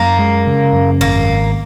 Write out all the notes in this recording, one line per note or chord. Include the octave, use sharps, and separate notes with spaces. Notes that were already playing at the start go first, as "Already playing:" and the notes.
Already playing: F#2 A#3
G#3
C#3
F#2
G#1 A#3